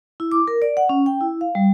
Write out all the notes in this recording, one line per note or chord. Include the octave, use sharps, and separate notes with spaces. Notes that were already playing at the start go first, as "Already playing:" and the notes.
E4
D6
A#4
D5
F#5
C#4
G5
E4
F5
G3